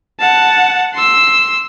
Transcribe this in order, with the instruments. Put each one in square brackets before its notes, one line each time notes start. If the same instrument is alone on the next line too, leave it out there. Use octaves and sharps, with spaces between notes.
[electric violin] F#5 A5
C6 E6